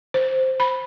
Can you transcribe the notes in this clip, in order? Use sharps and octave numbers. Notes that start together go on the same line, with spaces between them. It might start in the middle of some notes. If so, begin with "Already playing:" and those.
C5
B5